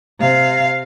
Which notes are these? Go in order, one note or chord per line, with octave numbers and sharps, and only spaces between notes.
C3 F5